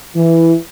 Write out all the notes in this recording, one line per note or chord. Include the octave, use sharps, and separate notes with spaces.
E3